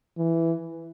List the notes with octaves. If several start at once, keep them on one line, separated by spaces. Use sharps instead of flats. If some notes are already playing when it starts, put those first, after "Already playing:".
E3